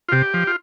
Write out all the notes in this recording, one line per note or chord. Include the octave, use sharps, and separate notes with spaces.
F4
C3 G4
F3
F4